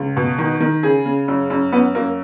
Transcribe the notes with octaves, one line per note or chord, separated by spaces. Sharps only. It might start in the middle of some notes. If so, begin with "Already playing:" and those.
Already playing: C#2
B2
D#3
D#3
C#3 G#4
C#3
F#2
F#2
F#2 B3
F#2 A#3